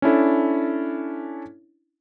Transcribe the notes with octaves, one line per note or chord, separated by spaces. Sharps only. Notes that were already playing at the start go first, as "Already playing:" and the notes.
C#4 D4 E4 A4